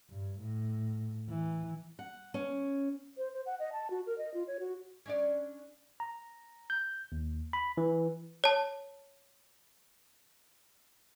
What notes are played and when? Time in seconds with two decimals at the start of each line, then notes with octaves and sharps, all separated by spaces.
0.10 G2
0.40 A2
1.29 E3
1.99 F#5
2.34 C#4
3.17 C5
3.33 C5
3.46 F#5
3.59 D#5
3.72 A5
3.90 F#4
4.06 A#4
4.18 D#5
4.34 F4
4.47 C#5
4.60 F#4
5.06 C#4 D4 D5
6.00 A#5
6.70 G6
7.12 D#2
7.53 B5
7.77 E3
8.44 C#5 A5